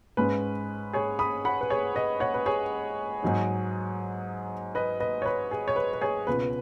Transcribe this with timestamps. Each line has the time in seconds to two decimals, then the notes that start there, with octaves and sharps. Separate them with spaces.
0.17 G#2 G#3 C#4 B4
0.93 G#4 C#5
1.19 B5 D#6
1.45 F#5 B5
1.61 B4
1.70 G#4 C#5
1.95 B4 D#5
2.20 C#5 F#5
2.34 B4
2.46 G#4 C#5
3.23 G#2 F#3 D#4
4.75 B4 D#5
5.00 B4 D#5
5.22 C#5
5.26 B4
5.51 G#4
5.68 C#5
5.76 B4
5.93 B4
6.01 G#4 C#5
6.27 C#2 B2 B3 B4